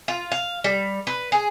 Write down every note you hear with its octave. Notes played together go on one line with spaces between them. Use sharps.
F4
F5
G3
B4
G#4